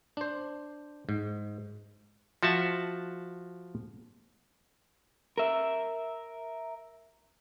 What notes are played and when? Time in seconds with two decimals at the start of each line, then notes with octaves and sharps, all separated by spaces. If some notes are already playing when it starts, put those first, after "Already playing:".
0.17 D4 C5
1.09 G#2
2.43 F3 F#4 E5 A5
5.38 A#4 E5